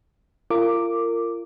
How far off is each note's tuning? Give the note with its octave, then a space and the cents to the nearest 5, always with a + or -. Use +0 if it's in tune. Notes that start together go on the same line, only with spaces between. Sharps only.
F4 -30 A#4 -25 D6 +0